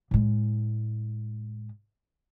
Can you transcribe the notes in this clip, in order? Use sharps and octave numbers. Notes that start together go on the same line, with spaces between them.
A2 G#3